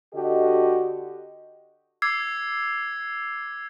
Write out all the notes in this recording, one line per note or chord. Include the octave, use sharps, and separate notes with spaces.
D3 F#4 G4 A4 D#5
D6 E6 G#6 C7